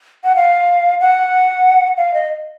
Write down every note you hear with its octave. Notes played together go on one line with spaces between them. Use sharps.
F#5
F5
F#5
F5
D#5